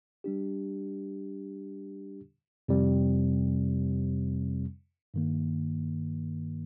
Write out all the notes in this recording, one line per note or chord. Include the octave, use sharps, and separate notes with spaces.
G3 D4 G4
F2 C3 G3 C4
G2 D#3 A#3